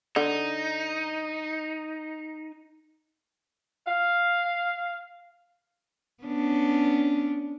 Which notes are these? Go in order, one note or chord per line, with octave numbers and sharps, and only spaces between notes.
D3 D#4
F5
B3 C#4 D4